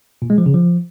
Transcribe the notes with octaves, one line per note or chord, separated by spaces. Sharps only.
A#2
G#3
F3
C#3
F3